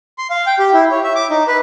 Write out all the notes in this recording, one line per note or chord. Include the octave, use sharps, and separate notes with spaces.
C6
F5
G5
G4
E4
C#5
E5
D6
D#4
B4